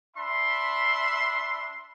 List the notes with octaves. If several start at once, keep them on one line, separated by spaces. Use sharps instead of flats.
D4 E5 B5 C6